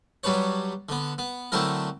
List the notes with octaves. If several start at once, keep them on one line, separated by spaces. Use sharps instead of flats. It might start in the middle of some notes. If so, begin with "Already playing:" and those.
F#3 G3 D4 B4 C#5
D3 B3
B3
D3 F#3 A3 C4 E4 A#4